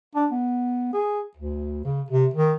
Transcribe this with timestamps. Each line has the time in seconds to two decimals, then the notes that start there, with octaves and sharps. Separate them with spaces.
0.15 D4
0.31 B3
0.93 G#4
1.37 D2
1.85 C#3
2.10 C3
2.34 D#3